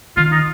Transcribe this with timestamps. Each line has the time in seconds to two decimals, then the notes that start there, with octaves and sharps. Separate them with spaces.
0.17 D#3 F4
0.32 D#4